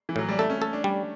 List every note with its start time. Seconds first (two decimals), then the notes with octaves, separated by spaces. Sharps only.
0.09 E3
0.16 A2 F#3
0.29 G3
0.39 A3 A4
0.50 C#4
0.62 A4
0.73 D4
0.84 G3